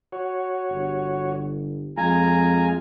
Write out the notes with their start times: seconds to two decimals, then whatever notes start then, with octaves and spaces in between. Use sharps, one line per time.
0.12 F#4 C#5
0.71 G1
1.97 F2 G#3 F4 G#5 A#5